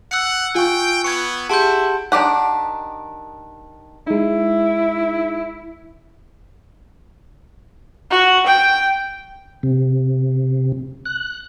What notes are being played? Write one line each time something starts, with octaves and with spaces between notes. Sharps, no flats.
F#5 E6 F#6 C#7
F4 G5 G#5 C#6
B3 C#6 G#6 C#7
E4 G4 G#4 F#5 A5 C6 G6 D7
D#3 D4 D#4 G4 F#5
G#3 D#4 E4
F#4
G5
C3
F#6